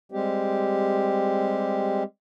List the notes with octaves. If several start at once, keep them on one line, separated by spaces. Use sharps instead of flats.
G3 G#3 C4 G4